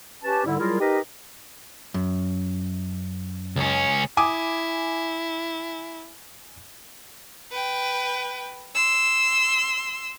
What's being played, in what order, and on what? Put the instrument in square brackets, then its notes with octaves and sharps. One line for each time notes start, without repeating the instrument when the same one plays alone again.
[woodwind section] C#4 G4 B4 A5
G#2 D3 G3 E4
F#3 G3 E4 F4 G#4 A#4
D#4 G4 A#4 B4 D#5
[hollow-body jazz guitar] F#2
[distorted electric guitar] C#2 C#4
[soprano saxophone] E4 [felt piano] G#5 D6 D#6
[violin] B4 G5
C6 E6